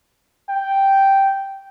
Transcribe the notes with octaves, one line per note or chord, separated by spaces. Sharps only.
G5